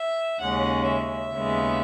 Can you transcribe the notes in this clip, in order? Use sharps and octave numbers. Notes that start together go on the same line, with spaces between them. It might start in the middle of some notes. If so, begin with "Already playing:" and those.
Already playing: E5
D#2 C#3 G#3 C#4 F#5
E5
D#2 C#3 G#3 B3